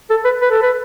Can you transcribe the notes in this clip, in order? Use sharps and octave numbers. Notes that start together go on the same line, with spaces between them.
A4
B4
B4
A4
B4